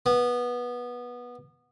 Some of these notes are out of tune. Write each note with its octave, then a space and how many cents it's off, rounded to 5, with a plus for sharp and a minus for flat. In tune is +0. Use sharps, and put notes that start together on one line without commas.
B3 -15